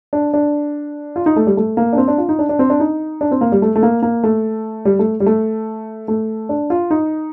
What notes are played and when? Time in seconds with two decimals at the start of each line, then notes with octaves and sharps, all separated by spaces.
0.13 D4
0.34 D4
1.16 F4
1.26 D#4
1.36 A3
1.47 G3
1.57 A3
1.77 A#3
1.93 D4
1.97 C4
2.08 D4
2.18 F4
2.29 D#4
2.39 D4
2.49 D4
2.59 C4
2.70 D4
2.80 D#4
3.21 D4
3.31 C4
3.41 A#3
3.52 G3
3.62 A3
3.76 A3
3.83 A#3
4.03 A#3
4.23 A3
4.85 G3
4.99 A3
5.20 G3
5.26 A3
6.08 A3
6.49 D4
6.70 F4
6.91 D#4